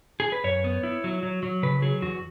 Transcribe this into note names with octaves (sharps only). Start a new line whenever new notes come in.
G#4
B4
F#2 C#5
B3
E4
F#3
F#3
F#3
C#3 B4
F#3 G#4
E2 F#4